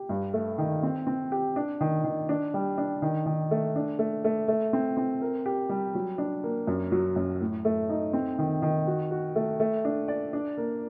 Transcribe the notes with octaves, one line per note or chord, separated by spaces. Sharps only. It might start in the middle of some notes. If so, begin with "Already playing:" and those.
Already playing: G4
G2
A3
D#3
C4
C4
G4
D4
D#3
D#3
D4
G3
D4
D#3
D#3
A3
D4
A3
A3
A3
C4
C4
A#4
G4
G3
F#3
D4
A#3
F#2
F#3
F#2
A2
A3
D#4
C4
D#3
D#3
F#4
F#4
A3
A3
D4
D5
D4
A#3